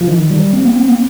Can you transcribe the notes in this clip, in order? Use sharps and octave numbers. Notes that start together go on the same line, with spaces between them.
F3
D#3
G3
C4
A#3
C4
A#3